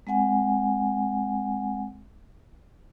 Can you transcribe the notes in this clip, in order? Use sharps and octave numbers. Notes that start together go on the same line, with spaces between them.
G#3 C4 F#5 G#5